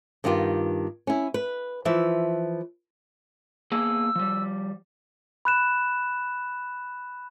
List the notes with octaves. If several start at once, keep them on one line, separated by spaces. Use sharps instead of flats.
G2 D#3 B3 F4 G4
C#4 E4
B4
E3 F3 E5
A#3 B3 G#4 E6
F3 G3
B5 F#6 E7